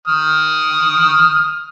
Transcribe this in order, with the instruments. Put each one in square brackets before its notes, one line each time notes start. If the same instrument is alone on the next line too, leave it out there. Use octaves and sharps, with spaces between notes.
[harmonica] D#6 F6